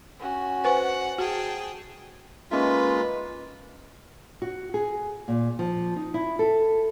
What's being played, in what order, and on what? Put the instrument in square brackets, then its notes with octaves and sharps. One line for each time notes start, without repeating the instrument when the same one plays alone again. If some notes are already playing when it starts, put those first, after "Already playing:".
[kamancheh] C#4 F#4
[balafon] B4 [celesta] C5 G#5 C#6 [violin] F#5
[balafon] F#4 [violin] G#4 G5 [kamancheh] A5
[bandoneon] G#3 A#3 F4 [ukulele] C#4 D#4 E5 [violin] B4
[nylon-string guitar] F#4
G#4
A#2
F3
D#4
E4
A4